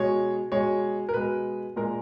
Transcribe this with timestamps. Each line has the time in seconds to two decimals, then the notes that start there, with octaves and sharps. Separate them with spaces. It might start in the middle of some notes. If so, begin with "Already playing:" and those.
Already playing: B2 G#3 C#5
0.52 B2 G#3 C#5
1.09 A#4
1.14 B2 G#3 B4
1.76 A#2 G#3 A#4